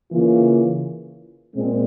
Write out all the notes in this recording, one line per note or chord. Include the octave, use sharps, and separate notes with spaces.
C#3 E3 A#3 F4
A#2 G#3 C4